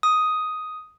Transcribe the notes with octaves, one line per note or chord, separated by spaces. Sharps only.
D#6